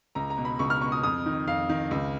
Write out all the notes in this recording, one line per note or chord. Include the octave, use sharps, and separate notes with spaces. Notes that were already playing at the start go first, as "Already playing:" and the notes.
C#2 A#5
A#5
B2
B5
C#2 C#6
F6
B2 C#6
D#6
F2 D#6
D#3
F2 F5
D#3
C#2